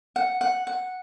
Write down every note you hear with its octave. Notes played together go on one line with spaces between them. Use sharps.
F#5
F#5
F#5